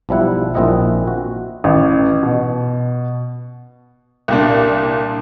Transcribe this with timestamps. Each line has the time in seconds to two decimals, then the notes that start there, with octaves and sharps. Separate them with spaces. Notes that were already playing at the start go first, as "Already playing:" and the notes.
0.09 B1 F3 G3 E4 F#5
0.54 A#1 A#2 C4 E4 D#5 F#5
1.08 F#4
1.64 A1
2.23 B2
4.28 C2 A#2 D4